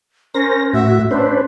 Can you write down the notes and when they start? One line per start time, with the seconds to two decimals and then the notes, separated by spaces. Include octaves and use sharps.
0.35 C#4 A#4 C5 A#6
0.74 A2 F#4 E5
1.11 C#4 D4 B4 C5